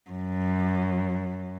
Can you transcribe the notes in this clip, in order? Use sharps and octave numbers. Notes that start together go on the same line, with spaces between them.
F#2